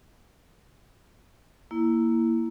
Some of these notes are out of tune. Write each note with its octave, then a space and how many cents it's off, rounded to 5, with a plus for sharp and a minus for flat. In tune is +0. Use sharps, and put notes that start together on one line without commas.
A#3 +0 E4 +0